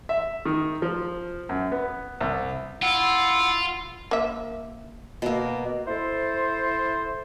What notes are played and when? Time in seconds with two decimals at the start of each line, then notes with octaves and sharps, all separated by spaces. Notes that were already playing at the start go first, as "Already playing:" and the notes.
0.09 E5
0.46 D#3
0.82 F3
1.49 F#2
1.72 B3
2.20 C2
2.82 E4 F4 F#5
4.11 A#3 E5
5.22 B2 A#3
5.87 E4 A4 C5